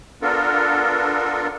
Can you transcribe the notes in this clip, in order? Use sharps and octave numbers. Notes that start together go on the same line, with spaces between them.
B3 D4 F4 A4 A#4